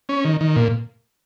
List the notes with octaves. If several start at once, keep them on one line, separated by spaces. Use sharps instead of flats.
C#4
D#3
D#3
A#2